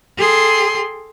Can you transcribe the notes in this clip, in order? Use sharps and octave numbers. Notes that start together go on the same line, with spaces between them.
G#4 A4 G5 C6